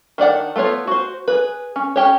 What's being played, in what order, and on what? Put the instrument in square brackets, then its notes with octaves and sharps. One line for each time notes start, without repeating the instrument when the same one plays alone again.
[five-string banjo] D#3 D4 D5 F#5
A3 B3 F4 C#5
F#4 C5
G#4 B4
C#4
C#4 G4 C#5